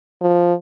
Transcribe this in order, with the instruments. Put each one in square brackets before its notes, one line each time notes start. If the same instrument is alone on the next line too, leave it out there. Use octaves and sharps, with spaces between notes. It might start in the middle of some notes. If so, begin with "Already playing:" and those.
[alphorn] F3